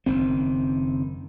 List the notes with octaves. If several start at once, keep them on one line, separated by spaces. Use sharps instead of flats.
F#1 D#3 C4